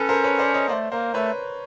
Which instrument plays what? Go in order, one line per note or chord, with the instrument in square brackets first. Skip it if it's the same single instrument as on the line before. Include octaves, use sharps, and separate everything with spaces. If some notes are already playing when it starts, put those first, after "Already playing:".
Already playing: [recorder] C#4 [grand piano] A4 B4
[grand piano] A#4 C5
B4 C#5
C5 D5
C#5 D#5
[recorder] A#3 [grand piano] C5 D5
[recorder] A3
[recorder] A#3 [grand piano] A#4 C5
[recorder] A3 [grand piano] B4 C#5